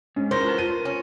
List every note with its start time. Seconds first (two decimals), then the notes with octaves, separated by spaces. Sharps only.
0.16 G#2 C#4
0.31 E4 A#4 C5 C#5 A#6
0.44 F4 B4 A5
0.58 F4 D#7
0.85 C#4